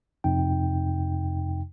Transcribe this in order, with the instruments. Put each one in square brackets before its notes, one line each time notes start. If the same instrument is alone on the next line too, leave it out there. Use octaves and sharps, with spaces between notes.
[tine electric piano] F2 C3 D#4 G5